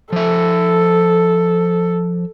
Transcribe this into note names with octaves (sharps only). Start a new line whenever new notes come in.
F3 A4 E5